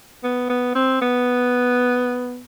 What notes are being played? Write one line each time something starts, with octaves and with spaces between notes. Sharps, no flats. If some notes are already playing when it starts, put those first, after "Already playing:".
B3
B3
C4
B3